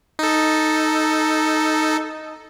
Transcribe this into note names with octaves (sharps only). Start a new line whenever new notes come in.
D#4 A4